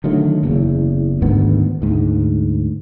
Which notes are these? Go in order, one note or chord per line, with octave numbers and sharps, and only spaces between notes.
D3 D#3 F#3 A3
F#1 E2 C#3
D2 G#2 D#3 B3
D2 G#2